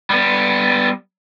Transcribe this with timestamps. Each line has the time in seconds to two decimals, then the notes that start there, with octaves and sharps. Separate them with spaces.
0.10 G3 B3